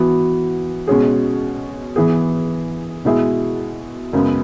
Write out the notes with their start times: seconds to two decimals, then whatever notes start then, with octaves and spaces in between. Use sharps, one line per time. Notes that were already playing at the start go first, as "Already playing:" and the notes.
Already playing: E3 B3 F#4
0.88 B2 G#3 C#4 G#4
1.96 E3 B3 G#4
3.05 B2 G#3 E4 G#4
4.13 F#2 C#3 G#3 B3